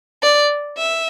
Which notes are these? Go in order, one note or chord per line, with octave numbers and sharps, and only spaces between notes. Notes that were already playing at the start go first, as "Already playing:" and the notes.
D5
E5